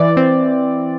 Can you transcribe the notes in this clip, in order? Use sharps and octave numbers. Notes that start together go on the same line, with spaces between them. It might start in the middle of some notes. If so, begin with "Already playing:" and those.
Already playing: E3 D5
C4